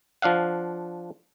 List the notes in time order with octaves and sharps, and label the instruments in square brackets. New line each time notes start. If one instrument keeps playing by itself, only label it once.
[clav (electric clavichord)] F3 D4 F5 F#5